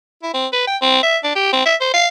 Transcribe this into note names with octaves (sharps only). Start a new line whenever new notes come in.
E4
C4
B4
G5
C4
E5
D4
G4
C4
E5
C5
F5